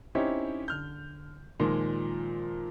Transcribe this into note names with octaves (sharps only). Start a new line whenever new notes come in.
C4 C#4 D#4 E4 G4 C#5
D3 F6 G6
A#2 D#3 F3 G#3